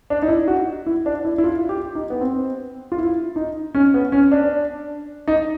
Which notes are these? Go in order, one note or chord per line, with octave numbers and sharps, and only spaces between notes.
D4
D#4
E4
F#4
E4
D4
E4
E4
F4
G4
D#4
B3
C4
F4
E4
D#4
C#4
B3
C#4
D4
D#4